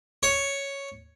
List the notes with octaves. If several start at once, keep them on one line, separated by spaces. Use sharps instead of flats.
C#5